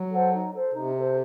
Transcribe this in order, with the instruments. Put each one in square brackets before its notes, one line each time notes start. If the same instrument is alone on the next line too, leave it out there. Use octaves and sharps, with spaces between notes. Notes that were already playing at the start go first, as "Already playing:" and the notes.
Already playing: [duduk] F#3
[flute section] A4 C5 F#5
D#4
A4 C5
[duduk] C3 [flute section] D#4
[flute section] A4 C5